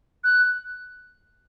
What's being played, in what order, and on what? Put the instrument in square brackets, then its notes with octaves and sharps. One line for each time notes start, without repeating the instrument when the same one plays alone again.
[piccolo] F#6